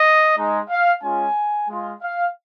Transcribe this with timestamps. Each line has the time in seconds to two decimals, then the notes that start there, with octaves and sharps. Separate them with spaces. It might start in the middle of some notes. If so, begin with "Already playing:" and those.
Already playing: D#5
0.36 G#3 D#4
0.69 F5
1.02 G#3 C#4 F4 G#5
1.69 G#3 F4
2.02 F5